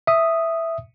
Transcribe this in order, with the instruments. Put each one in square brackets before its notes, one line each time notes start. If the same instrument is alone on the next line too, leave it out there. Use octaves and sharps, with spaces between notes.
[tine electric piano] E5 D#6